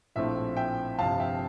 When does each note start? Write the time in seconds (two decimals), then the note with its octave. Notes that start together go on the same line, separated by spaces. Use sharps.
0.15 A#1 A2 F3 A3 C4 E5
0.56 E5 G5
0.98 G1 F2 C3 F5 A5
1.19 E5 G5